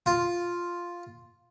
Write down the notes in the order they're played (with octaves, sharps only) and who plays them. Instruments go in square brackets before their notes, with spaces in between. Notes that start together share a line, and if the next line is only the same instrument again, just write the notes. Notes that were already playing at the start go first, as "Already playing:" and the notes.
[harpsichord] F4